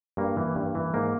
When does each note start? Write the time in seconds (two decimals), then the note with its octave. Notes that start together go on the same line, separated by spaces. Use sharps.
0.17 G2 A#3
0.37 E3
0.55 G2
0.75 E3
0.94 G#2 A#3